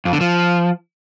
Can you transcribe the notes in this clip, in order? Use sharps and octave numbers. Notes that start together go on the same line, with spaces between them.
F2
D3
F3